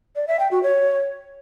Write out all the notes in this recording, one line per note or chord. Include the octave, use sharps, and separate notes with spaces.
D5
E5
G5
F#4
C#5